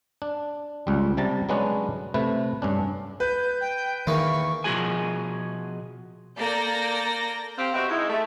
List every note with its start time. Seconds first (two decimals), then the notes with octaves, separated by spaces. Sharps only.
0.22 D4
0.87 C#2 G3
1.17 C3 G3 A5 A#5
1.49 F#3 G#3 B3 C#4 D4 F#4
2.14 C3 A3 B4
2.62 G2 C#4 D4
3.20 B4 G6
3.61 G5
4.07 E2 D#3 E3 A#3 C#6
4.64 B2 F3 F#3 F#4 G#4 G#5
6.36 A#3 A4 D5 G6 A#6
7.58 C4 G4 F5
7.74 B3 C4 F#4 G4 D#5 E5
7.89 G#3 D#4 E4
8.10 A3